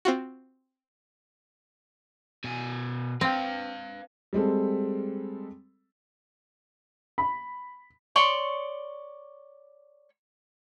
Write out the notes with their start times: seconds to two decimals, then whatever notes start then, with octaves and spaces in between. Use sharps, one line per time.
0.05 C4 F4 F#4
2.44 B2 G#5
3.21 C4 B4 F5
4.33 G3 G#3 C4 A4
7.18 B5
8.16 C#5 D5 C6 C#6